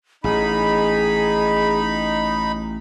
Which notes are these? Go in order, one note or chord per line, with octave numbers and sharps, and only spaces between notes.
A1 D#4 G#4 B5